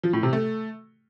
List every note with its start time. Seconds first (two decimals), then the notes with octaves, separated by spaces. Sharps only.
0.03 F3
0.13 A2
0.23 C3
0.33 A3